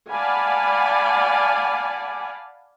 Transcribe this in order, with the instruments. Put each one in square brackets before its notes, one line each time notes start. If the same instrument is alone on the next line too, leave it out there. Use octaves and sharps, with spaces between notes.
[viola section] D5 F5 F#5 G#5 A5 B5